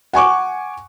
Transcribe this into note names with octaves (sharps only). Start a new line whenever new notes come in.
F#5 G#5 C#6 D6